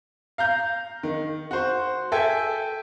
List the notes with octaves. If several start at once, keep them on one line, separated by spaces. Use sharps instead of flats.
F5 A#5 G6
D#3
F#4 C5
A4 E5 G5 G#5 G#6